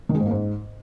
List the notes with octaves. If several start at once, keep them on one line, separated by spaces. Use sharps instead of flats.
D#3
G#3
G#2
A#3
G#2